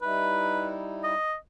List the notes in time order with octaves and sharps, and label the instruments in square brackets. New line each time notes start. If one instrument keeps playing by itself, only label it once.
[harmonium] G3 D#4 E4 [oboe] B4
[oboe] D#5